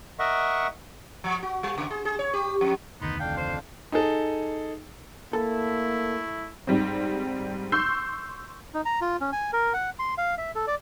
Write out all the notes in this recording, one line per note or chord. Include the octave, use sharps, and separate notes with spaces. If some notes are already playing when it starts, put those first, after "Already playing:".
A#4 D#5 E5 F#5 C#6
F3
F#4
G3
C#3
G#4
G#4
C#5
G4
F2
F1 D2 D#3 B3 D#4 A#5 C6
F2 D4 F5 G5
C5
D#4 G#4 A4
A3 A#3 E4 A4
G#2 G3 C4
C6 C#6 E6 G6 C7
D#4
A#5
F4
C#4
G#5
A#4
F#5
C6
F5
E5
A4
D5